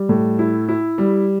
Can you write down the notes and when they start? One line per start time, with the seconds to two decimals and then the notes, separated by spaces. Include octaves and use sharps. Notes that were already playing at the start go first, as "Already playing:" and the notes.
Already playing: G3
0.09 A2
0.39 E4
0.68 E4
0.98 G3